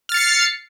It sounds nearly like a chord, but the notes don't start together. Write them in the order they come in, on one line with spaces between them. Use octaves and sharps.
F6 A6 C#7 C7